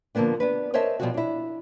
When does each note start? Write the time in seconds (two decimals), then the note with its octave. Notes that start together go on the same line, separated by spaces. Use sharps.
0.15 D3 F3 F#3 A#3 B3 D4
0.40 B3 D4 B4
0.73 A#4 C5 C#5 D#5 E5 A5
1.00 B2 E3 F3 G3 F4 F#4
1.14 D4 E4